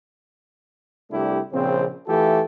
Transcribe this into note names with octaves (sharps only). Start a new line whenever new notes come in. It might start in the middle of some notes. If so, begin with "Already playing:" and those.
C2 A3 D4 E4 G4
A#1 C#3 C4
E3 A3 F4 G4 A4